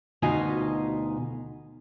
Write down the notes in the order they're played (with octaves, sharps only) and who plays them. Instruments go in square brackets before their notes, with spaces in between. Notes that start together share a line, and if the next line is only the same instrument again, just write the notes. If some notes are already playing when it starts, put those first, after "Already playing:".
[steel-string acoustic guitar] D2 B2 D#4 F4 D#5 G#5